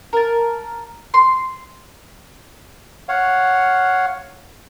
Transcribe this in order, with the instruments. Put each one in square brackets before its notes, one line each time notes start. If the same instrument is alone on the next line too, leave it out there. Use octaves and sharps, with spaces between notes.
[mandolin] A#4 A5
C6
[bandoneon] C#5 F5 F#5